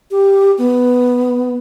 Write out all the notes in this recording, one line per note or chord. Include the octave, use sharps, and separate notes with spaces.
G4
B3